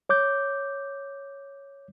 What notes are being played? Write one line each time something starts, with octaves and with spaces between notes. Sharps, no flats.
C#5 D6 G6